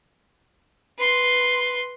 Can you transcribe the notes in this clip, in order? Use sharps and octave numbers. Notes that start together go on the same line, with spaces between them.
B4 C6